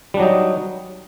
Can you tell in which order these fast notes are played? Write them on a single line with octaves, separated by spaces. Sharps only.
G3 D4 F#3 D#4